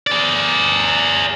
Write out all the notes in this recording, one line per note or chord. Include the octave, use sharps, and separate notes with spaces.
G#4 D5